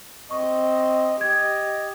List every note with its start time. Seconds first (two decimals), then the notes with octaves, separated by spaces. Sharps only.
0.31 C4 D#5 C#6
1.21 G4 D#5 G#6